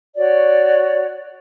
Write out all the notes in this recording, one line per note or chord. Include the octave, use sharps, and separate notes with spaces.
F#4 C#5 D5